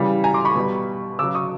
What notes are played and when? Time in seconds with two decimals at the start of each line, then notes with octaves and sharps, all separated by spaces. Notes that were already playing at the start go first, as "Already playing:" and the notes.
Already playing: C#3 E3 G3
0.24 G#5 A#5
0.34 C6 D6
0.45 B5 C#6
0.55 B2 G3
1.19 C#3 F#3 D6 E6
1.35 C#6 D#6